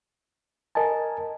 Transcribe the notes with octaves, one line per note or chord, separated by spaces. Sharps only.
A#4 D#5 G#5 A5